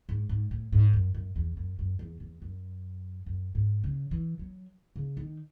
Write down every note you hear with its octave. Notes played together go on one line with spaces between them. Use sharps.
G#2
G#2
A2
G#2
F#2
F#2
E2
F#2
F#2
E2
E2
F#2
F#2
G#2
C#3
E3
F#3
C#3
D#3